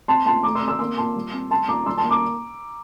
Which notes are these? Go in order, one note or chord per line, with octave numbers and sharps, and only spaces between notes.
C4 A5 C6
A#2 A5 C6
A3 A#5 D6
C6 E6
C4
C6 E6
A#3 C6 E6
A#2 A5 C6
G3
C4
C4 A5 C6
A#2 A#5 D6
G3 C6 E6
A5 C6
A#3
A#5 D6